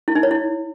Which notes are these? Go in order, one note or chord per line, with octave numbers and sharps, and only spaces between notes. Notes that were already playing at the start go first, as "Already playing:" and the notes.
E4
D#4
C#5
E4